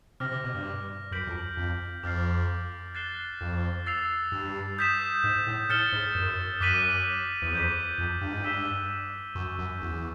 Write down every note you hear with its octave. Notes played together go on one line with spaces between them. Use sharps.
C3 D6 F6 A#6
C3
B2
G2
F#2 G6 B6 D7 F#7
F2
F2
F2 D6 F6 A6 C7
F#6 A6 C7 E7 G7
F2
E6 A6 C7 F7
G2
D#6 G6 B6 E7
G#2
A2
A2 F6 A6 C#7 E7 G7
G#2
F#2
F#2 D6 F#6 B6 D#7 F#7
E2
F2 D6 G6 B6
F2
G2
G#2
G2 E6 G6 B6 E7 G7
F#2 C#6 E6 G6
F#2
E2